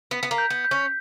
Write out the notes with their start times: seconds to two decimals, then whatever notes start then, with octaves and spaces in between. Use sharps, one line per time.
0.11 B3 B6
0.23 B3
0.31 A#3
0.38 G6
0.50 B3
0.65 G6
0.71 C#4